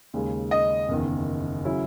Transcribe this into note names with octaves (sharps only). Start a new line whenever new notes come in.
D#2 C#3 G#3
D#5
F#1 E2 D#3
C#3 F#3 C#4 E4